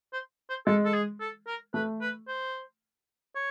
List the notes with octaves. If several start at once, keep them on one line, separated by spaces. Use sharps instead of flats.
C5
C5
G#3 A4
A4
G#4
A4
A#4
A3 B4
B4
C5
C#5